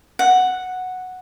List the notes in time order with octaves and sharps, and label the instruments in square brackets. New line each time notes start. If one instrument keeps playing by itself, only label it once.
[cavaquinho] F#5